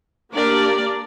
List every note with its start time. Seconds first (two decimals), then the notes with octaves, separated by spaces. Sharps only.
0.33 A#3 D4 G4 A#4 D5